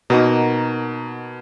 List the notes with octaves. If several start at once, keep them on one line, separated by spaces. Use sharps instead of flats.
B2 A#3 D#4 F#4 A#4